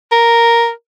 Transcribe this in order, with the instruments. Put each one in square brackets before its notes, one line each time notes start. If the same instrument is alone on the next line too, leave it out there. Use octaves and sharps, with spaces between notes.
[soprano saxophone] A#4